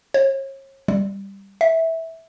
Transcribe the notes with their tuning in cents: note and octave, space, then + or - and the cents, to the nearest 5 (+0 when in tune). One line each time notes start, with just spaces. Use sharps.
C#5 -40
G3 +5
E5 -15